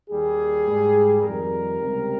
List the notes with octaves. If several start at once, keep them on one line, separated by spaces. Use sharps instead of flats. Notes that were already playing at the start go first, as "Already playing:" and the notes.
D#2 D#3 G3 G#4
G#2 G3
F2 D#3 G3 A#4
C#2 C3 G3